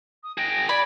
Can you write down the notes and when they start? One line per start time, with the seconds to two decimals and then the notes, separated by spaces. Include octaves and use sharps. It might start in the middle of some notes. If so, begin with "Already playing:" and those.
0.24 D#6
0.38 G#4 G5 A#6
0.69 D5 B5 G#6